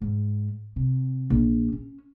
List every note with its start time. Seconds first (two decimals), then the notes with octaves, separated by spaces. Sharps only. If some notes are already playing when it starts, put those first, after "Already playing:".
0.02 G#2
0.76 C3
1.30 A#1
1.72 C#4